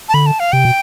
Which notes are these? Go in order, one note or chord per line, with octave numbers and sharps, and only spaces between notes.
A5
D3 B5
A5
F5
C3 G5
B2